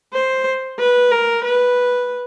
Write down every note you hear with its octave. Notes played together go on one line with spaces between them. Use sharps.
C5
B4
A#4
B4